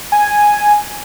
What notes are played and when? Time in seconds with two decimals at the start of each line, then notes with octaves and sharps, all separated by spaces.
0.12 G#5